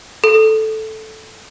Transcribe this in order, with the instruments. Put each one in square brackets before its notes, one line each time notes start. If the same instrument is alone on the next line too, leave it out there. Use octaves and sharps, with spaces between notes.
[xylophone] A4